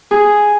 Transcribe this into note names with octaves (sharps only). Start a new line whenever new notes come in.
G#4